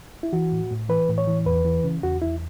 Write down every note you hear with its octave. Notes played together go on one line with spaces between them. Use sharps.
E4
E3 F#4
A2
A2
E3 B4
A2
C#5
E3
E2 B4
E3
C#3
E2 F#4
E2 E4